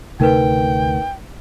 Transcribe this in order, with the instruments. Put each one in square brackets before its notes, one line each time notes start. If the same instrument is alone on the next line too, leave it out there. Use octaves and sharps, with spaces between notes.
[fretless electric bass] D2 C3 A3 [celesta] D#4 A#4 B4 [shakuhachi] G5